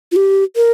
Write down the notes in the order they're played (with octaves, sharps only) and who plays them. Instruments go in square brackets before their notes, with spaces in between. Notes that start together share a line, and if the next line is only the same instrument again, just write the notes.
[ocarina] F4
G4
A#4